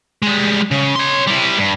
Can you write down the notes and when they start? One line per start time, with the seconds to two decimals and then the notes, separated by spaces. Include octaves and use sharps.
0.22 G3 G#3
0.71 C#3
0.95 C#5 C6
1.27 G3 E4
1.58 G2